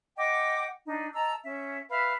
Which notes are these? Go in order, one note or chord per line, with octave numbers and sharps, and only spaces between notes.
D#5 F#5 G5 D6
D4 D#4
D#5 A5 A#5 E6
C#4 E5
B4 E5 F5 B5